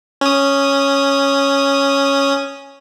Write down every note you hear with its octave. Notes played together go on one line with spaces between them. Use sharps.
C#4 D#6